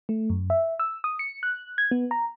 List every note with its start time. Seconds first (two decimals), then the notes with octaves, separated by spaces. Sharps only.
0.09 A3
0.30 F#2
0.50 E5
0.79 E6
1.04 D#6
1.19 C#7
1.43 F#6
1.78 G#6
1.91 B3
2.11 A#5